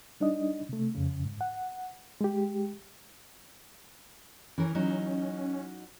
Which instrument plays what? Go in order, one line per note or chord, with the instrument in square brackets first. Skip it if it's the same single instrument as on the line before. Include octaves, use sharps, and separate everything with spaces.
[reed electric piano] G3 D4 D#4 D#5
C3 A3
F2 C#3
G#2
F#5
G#3 G4
[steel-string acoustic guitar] E3 A#4 [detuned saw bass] C#4
[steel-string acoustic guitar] F#3 D#4